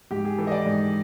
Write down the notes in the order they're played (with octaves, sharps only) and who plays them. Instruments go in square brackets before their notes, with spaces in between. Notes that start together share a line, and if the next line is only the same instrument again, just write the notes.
[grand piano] G#2 G4
G#4
E3 A4
D#5
D5
G#2